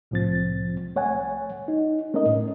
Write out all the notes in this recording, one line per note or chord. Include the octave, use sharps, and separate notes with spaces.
C2 A2 F3 C4 A6
A3 C#5 F#5 G#5
D#4
A3 C#4 A#4 D#5
A2